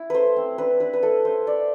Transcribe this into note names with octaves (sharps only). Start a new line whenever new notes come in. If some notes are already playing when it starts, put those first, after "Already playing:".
Already playing: E4
A3 B4 C5
C4
D4 B4
D4 B4
B4
E4 A4
E4 C5
E4 D5